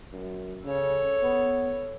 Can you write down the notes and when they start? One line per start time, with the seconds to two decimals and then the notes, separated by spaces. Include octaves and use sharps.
0.13 F#2
0.65 C#3 A4 C#5
1.23 B3